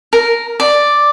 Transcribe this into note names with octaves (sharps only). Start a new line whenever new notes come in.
A#4
D5